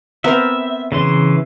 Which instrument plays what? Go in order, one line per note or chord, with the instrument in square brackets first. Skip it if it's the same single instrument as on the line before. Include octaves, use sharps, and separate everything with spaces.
[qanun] B3 C4 A#4 [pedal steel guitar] E5
[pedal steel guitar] C#3 E3 C6